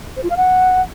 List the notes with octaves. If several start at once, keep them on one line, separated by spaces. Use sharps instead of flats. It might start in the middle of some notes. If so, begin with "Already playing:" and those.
C5
F4
F5
F#5